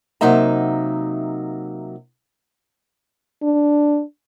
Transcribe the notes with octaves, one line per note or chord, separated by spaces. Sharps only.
C3 F#3 A#3 D#4 E5 A#5
D4